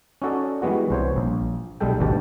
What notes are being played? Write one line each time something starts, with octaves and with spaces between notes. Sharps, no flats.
C#4 D#4 F#4 A4 D5
E3 G3 G#3 B3 F#4
C2 C5 C#5
A#1
B1 G3 G#3 A4 G5
G#1 D2 B2 G4 A5